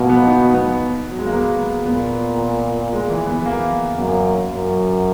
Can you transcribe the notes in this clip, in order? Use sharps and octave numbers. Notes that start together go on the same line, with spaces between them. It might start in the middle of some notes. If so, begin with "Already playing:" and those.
Already playing: B2 A#3
B3
D#4
B3
F#3
G#3
A#3
B3
A#2 B3
G#3
E3
B3
A#3
F#2 A#3
F#2